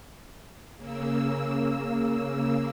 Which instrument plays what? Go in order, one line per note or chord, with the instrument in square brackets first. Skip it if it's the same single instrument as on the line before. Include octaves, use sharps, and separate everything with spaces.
[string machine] C#3 A#3 E6